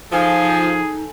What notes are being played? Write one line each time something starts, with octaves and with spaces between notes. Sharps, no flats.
F3 D#4 G#4 A4 G#5 A#5